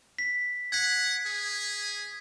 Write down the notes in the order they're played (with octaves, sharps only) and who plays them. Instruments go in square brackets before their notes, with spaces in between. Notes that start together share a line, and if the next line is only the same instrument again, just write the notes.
[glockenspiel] B6
[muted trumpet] F#5 [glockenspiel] G#6 B6
[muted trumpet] G#4